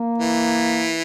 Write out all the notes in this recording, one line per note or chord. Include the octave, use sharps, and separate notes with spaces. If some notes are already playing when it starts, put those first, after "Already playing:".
Already playing: A#3
E3